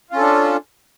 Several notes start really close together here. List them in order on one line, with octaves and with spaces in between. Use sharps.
F4 C#4 A4 D4